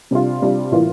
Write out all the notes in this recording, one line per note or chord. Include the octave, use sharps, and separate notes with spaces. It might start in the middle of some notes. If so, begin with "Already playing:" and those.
C3 G3 D4 F4
C3 G3 D4 F4
A2 E3 A#3 F4